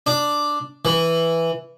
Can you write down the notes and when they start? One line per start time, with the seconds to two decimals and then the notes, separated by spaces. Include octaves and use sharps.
0.07 D4
0.85 E3